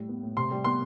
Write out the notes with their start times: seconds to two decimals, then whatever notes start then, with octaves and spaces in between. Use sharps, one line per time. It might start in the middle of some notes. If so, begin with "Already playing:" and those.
Already playing: A2 G3
0.09 B3
0.23 A2
0.37 C3 C6
0.51 G3
0.64 B3 C6